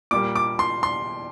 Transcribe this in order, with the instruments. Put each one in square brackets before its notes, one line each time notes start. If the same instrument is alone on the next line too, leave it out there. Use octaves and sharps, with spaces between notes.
[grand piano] A#2 G3 A#3 D6
D6
C6
C6